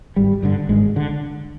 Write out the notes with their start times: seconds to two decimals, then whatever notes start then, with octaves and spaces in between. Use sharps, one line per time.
0.16 G#1 G3
0.43 G2 D3
0.69 G#1 G#3
0.96 D3